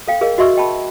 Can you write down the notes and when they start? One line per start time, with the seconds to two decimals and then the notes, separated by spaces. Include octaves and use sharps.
0.08 A4 F5 G5
0.21 G#4 A#4 D#5 F5
0.38 F#4 D#5 E5 C6 C#6 E6
0.57 D#5 G5 A5 B5